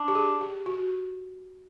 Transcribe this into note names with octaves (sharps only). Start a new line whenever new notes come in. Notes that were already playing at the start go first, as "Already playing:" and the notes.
Already playing: D4
G4
G#4
G4
F#4